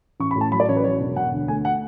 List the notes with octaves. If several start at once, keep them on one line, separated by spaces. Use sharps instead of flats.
A1 C#6
B5
A2
A5
F#3 B5
D5
A1 C#5
B4
F#3 C#5
E1
E1 F#5
D2
A3 G#5
F#5